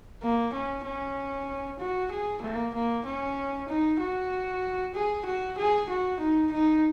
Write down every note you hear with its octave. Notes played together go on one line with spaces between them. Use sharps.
A#3
C#4
C#4
F#4
G#4
A#3
A#3
C#4
D#4
F#4
G#4
F#4
G#4
F#4
D#4
D#4